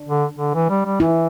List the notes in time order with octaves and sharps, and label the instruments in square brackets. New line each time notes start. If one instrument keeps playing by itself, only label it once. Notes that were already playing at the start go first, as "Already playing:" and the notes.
Already playing: [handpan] D4
[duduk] D3
D3
E3
G3
G3
[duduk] E3 [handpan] E4